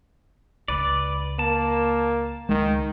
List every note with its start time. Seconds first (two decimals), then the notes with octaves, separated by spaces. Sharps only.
0.68 C#2 B4 D5
1.39 A#3 A5
2.49 C#2 D#3 G#3